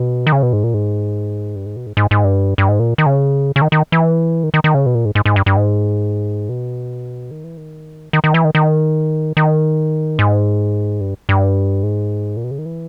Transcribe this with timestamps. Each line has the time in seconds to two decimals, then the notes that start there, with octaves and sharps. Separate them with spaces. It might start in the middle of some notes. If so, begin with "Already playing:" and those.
Already playing: B2
0.27 D#3
0.32 C#3
0.43 B2
0.53 G#2
0.64 A#2
0.74 G#2
1.56 G2
1.66 G#2
1.76 B2
1.87 G#2
1.97 G#2
2.11 G#2
2.24 G2
2.58 G2
2.69 G#2
2.80 A#2
2.98 D#3
3.06 C#3
3.56 C#3
3.62 D#3
3.72 D#3
3.92 E3
4.43 D#3
4.54 D#3
4.64 D#3
4.74 C#3
4.86 B2
4.95 A#2
5.05 G#2
5.15 G#2
5.25 G#2
5.36 G2
5.46 G2
5.57 G#2
6.49 B2
7.31 D#3
7.44 E3
7.57 D#3
8.13 D#3
8.24 D#3
8.34 E3
8.45 D#3
8.55 D#3
9.37 D#3
10.19 G#2
11.01 G2
11.29 G2
11.83 G#2
12.37 A#2
12.44 B2
12.51 C#3
12.58 D#3
12.66 E3